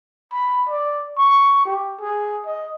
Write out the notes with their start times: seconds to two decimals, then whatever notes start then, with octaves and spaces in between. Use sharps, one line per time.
0.32 B5
0.69 D5
1.18 C#6
1.65 G4
2.01 G#4
2.46 D#5